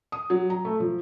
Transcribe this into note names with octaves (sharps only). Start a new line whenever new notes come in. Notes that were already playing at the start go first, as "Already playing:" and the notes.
D#6
F#3
A#5
A3
F3